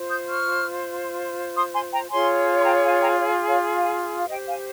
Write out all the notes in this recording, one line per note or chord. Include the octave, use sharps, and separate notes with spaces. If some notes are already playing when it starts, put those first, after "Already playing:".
Already playing: F4 C5
D#6 G6
C#6 F6
C6 D#6
G#5 C6
G5 A#5
F4 G#4 C#5 G#5 C6
C6
G5 A#5
F5 G#5
G5 A#5
C#5 F5
C#5 F5
F5 G#5
F5
G4 C5 D#5 G5
F5 G#5